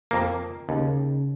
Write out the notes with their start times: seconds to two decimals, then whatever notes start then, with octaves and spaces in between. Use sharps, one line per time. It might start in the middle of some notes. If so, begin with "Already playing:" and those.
0.11 F2 A#3
0.69 D#2 C#3